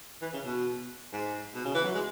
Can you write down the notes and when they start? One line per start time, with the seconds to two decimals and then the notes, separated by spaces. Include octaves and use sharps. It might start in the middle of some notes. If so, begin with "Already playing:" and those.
0.22 E3
0.33 C#3
0.44 B2
1.13 G#2
1.55 B2
1.65 C#3
1.74 E3
1.84 F#3
1.95 G#3